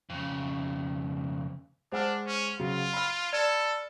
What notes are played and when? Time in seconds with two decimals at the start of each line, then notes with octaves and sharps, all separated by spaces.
0.10 F2 C#3
1.92 G#3 D4 C5 F#5 F6
2.27 C#4
2.60 C#3 F#3 F4
2.93 B5 F6
3.33 A4 D5